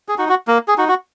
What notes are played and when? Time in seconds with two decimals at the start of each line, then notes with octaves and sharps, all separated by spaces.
0.09 G#4
0.18 D#4 F#4
0.29 F#4
0.48 A#3
0.68 G#4
0.78 D#4 F#4
0.88 F#4